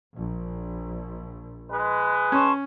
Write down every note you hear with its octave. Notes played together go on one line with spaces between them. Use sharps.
A#1
G#3 B4
C#4 A5 C6 C#6